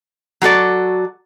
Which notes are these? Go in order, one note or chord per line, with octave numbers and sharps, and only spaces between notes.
F#3 F#4 A4 D5